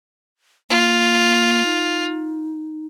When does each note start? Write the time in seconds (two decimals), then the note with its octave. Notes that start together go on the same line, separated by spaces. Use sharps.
0.70 A#3 F4
1.65 D#4